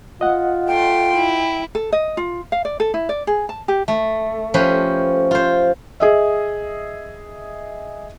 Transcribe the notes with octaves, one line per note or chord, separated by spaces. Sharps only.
F4 D#5 F#5
A3 G5 C6
E4
A4
D#5
F4
F5
D5
A4
E4
D5
G#4
A5
G4
A3
F3 C#4 G4 B4 C5
F4 C5
G#4 D#5 E5